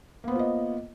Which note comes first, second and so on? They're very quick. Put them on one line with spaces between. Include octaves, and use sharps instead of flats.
A#3 B3 C5 F4 D#5